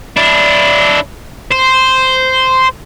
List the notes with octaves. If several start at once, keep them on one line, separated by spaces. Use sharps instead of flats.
D4 E4
C5